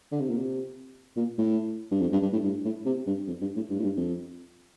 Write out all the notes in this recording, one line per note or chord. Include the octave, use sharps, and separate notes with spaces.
D3
C3
A#2
C3
A#2
A2
G2
F2
G2
G2
A2
G2
A2
C3
G2
F2
G2
A2
G2
A2
G2
F2